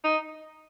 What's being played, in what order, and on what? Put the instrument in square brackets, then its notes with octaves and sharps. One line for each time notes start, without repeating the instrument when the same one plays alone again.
[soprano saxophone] D#4